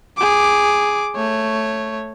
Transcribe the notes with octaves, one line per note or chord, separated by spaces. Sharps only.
G#4 D6
A3 C#5